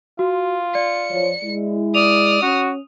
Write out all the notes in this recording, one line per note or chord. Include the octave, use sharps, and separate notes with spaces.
F4 F#4
D5 C#7
F3 C#5
G#3 E4
D5 D#6 F6 F7
C#4 F#4